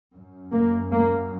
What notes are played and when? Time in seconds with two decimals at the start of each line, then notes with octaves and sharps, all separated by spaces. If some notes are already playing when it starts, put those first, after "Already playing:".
0.14 F#2
0.53 A#3
0.92 A#3